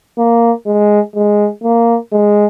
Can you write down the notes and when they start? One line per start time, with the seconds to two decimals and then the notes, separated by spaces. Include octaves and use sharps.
0.18 A#3
0.66 G#3
1.15 G#3
1.64 A#3
2.12 G#3